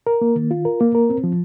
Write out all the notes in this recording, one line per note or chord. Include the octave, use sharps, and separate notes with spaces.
A#4
A#3
D#3
F4
A#4
A#3
A#4
C4
F3